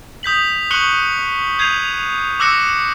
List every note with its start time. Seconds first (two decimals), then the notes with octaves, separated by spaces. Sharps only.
0.23 D#6 G6 B6 F#7
0.71 C#6 F#6 C#7 F#7 G7
1.58 D#6 G6 G#6 C7 D#7 F7
2.40 D6 E6 F#6 A#6 C#7 E7